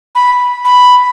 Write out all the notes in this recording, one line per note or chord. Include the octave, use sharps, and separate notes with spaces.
B5
B5